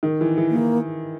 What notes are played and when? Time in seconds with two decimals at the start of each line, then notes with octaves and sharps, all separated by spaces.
0.03 D#3
0.21 E3
0.38 E3
0.50 A#3
0.56 E3